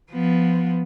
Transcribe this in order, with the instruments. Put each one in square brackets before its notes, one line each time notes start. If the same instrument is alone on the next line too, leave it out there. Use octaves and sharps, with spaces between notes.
[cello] F3 B3